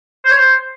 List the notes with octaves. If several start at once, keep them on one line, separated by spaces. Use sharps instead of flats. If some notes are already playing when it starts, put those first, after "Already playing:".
C5
C#5
C5